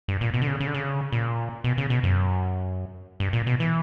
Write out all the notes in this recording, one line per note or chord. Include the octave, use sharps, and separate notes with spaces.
G2
A#2
B2
D3
C#3
C#3
D3
C#3
A#2
B2
C#3
B2
F#2
G2
A#2
B2
E3